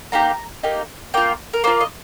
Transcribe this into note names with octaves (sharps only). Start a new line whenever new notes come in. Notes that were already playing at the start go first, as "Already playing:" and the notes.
A#3 D#4 G4 A#5
A#3 D#4 G4
A#3 F4 G5
A#4
A#3 F4 C5
D#5